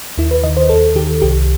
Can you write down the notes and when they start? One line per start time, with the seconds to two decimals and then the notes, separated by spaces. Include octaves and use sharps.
0.18 D#2 E4
0.31 B4
0.44 D#3 D#5
0.57 C5
0.69 D#2 A4
0.95 D#3 G4
1.22 C2 G4